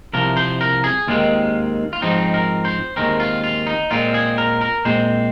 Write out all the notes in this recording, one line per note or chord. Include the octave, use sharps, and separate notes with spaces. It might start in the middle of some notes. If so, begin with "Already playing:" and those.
C2 C3 F3 A#4
C5
A#4
G#4
D#2 D#3 G#3 C4 F4
F4
G#2 F3 C4 D#4
A#4
C5
D#2 D#3 G#3 C4 A#4
F4
F4
D#4
A#2 G#3 C4 F4
G#4
A#4
A#4
A#2 G#3 C4 C5